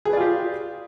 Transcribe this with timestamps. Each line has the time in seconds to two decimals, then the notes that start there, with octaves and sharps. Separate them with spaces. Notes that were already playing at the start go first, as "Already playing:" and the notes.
0.05 G#4
0.09 B4
0.13 D5
0.17 F4
0.21 G4